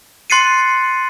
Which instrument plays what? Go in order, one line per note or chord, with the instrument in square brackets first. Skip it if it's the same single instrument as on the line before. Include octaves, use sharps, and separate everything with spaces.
[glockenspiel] C6 F#6 A6 C7 C#7 D#7